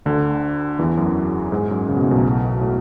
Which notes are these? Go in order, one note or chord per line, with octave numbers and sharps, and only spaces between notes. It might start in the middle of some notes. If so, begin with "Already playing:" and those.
D2 D3
E2 E3
F#2 F#3
G#2 G#3
F#2 F#3
C#3
B2
A2
B1 B2
A2